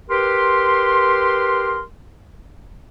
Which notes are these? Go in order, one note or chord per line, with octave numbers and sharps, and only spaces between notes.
G4 A#4 B4 C6